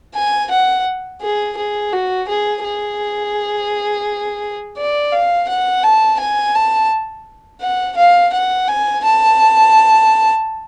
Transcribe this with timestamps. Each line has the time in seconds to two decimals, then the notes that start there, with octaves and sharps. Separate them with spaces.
0.15 G#5
0.51 F#5
1.22 G#4
1.57 G#4
1.93 F#4
2.29 G#4
2.64 G#4
4.78 D5
5.12 F5
5.48 F#5
5.83 A5
6.20 G#5
6.55 A5
7.61 F#5
7.97 F5
8.33 F#5
8.68 G#5
9.04 A5